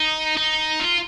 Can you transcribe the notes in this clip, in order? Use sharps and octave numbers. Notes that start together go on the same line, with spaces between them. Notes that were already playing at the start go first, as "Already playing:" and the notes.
Already playing: D#4
D#4
F4